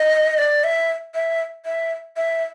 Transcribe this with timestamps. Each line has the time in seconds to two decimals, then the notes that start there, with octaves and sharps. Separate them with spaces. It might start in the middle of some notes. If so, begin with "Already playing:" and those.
Already playing: D#5
0.38 D5
0.64 E5
1.15 E5
1.66 E5
2.17 E5